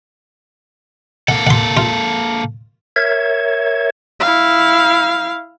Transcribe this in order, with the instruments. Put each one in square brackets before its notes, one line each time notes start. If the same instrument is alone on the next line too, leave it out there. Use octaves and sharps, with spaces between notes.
[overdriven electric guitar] A#3 A4 [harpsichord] F#5
[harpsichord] F#5 C6
F4
[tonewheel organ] A#4 C#5 E5 G#6
[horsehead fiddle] E4 F5